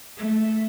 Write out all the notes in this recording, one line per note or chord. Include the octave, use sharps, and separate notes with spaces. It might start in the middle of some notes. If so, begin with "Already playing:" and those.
A3